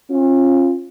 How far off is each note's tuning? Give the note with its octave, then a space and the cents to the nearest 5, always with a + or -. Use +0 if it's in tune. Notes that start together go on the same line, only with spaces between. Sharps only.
C#4 -40 F4 -5